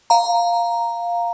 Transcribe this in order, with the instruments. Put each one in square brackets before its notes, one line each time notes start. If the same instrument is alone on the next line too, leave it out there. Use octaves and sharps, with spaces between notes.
[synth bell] F5 A#5